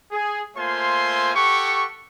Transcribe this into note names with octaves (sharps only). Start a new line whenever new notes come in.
G#4
A3 A#3 F4 C5 G#5 C6
G4 A4 F#5 C#6